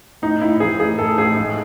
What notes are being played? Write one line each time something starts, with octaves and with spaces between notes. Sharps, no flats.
A2 D#4
A2 E4
E3 G#4
A2 G#4
A2 A4
A2 G#4
G#2